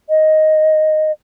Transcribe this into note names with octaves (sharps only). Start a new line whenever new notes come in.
D#5